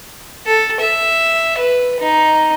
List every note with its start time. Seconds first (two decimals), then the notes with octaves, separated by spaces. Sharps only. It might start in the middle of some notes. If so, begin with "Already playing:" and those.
0.47 A4
0.80 E5
1.58 B4
2.00 D#4